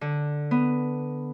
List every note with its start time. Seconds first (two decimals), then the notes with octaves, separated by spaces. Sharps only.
0.01 D3
0.51 B3